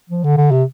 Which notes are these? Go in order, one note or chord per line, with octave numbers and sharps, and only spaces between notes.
F3
D3
D3
C3